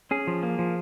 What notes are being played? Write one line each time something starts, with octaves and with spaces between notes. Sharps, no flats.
C#4 G#4
F3
A#3
F3